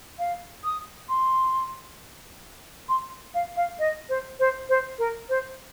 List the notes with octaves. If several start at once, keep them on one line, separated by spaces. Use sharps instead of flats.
F5
D#6
C6
C6
F5
F5
D#5
C5
C5
C5
A#4
C5